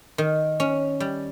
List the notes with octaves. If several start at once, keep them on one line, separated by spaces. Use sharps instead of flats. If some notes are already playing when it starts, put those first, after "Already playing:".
D#3
C#4
G3